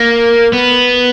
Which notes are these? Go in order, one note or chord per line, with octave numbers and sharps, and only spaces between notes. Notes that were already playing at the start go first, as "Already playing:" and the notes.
Already playing: A#3
B3